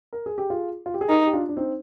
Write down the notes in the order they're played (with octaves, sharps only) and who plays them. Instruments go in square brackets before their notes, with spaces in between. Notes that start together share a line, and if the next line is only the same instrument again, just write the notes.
[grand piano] A#4
G#4
G4
F4 G#4
F4
G4
G#4
[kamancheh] D#4 [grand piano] G4 A#4
[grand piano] G4
D4 F4
D4
C4 D#4